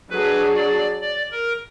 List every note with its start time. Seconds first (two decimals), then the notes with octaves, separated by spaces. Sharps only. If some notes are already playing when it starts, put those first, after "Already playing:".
0.10 F#3 D4 G#4 B4
0.55 D5
1.01 D5
1.32 A#4